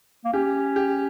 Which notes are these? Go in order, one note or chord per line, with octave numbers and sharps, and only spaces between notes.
A#3
C#4 G4
G4